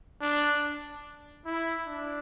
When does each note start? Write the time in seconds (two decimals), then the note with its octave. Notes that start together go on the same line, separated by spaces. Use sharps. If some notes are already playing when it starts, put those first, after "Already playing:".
0.21 D4
1.45 E4
1.87 D4